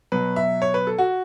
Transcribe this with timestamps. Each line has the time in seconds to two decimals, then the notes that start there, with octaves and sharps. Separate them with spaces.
0.12 B2 F#3 B4
0.36 E5
0.62 C#5
0.74 B4
0.87 A4
0.98 F#4